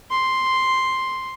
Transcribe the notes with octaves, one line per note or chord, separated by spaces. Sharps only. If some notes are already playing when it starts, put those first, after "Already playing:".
C6